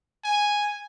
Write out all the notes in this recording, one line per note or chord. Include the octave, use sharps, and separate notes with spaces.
G#5